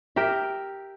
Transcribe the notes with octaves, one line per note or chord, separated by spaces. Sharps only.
G4 A#4 E5